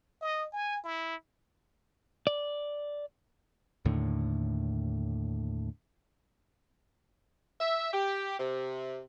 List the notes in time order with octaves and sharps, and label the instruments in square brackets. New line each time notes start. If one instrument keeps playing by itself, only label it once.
[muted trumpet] D#5
G#5
E4
[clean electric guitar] D5
[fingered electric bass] D#2 A2 D3
[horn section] E5
G4
C3